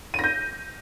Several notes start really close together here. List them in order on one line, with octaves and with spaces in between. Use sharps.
D#7 A#6 G6